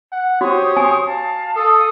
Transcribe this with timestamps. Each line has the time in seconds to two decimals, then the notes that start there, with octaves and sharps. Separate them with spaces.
0.12 F#5
0.41 F#4 G4 C5 C#5 D#6
0.77 G#5
1.06 F5 A5
1.56 A4 D#6